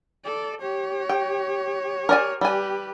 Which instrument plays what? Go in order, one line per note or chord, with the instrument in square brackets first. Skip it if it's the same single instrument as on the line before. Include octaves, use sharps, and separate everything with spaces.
[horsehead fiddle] A4 D5
G4 C#5
[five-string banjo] G5
A#4 D5 G#5
[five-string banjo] G3 G#5 [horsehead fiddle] G4 B4